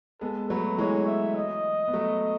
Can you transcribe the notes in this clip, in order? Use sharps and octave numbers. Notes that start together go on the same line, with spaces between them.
G#3 B3 A4
F#3 A3 B4
E3 G#3 C#5
E5
D#5
B3
F#3 A3